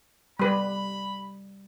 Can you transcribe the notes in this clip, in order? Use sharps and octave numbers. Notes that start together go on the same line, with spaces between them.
G3 B4 B5